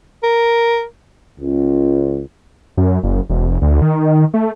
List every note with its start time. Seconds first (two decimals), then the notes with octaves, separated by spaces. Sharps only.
0.24 A#4
1.39 C#2
2.77 F#2
3.03 F#1
3.30 E1
3.46 F1
3.62 D2
3.82 D#3
4.34 A3